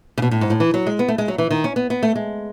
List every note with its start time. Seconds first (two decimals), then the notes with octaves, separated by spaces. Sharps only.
0.18 C#3
0.22 B2
0.31 A2
0.41 G#2
0.50 A2
0.60 E3
0.74 F#3
0.87 G#3
0.99 B3
1.08 A3
1.18 G#3
1.28 F#3
1.38 E3
1.51 D#3
1.64 C#4
1.76 B3
1.90 B3
2.03 A3
2.16 G#3